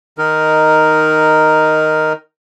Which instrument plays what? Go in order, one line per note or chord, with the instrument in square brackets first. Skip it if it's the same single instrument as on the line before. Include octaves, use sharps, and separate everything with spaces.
[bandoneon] D#3 D#4 A#4